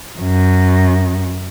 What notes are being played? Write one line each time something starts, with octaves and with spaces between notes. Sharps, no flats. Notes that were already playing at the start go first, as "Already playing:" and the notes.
F#2